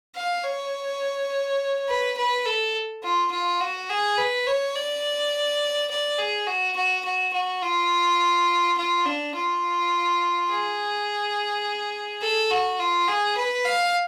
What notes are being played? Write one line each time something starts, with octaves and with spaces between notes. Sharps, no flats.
F5
C#5
B4
B4
A4
F4
F4
F#4
G#4
B4
C#5
D5
D5
G#4
F#4
F#4
F#4
F#4
F4
F4
D4
F4
G#4
A4
F#4
F4
G#4
B4
F5